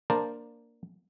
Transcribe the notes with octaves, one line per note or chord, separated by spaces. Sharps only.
A#3 D4 A#4 C5 A5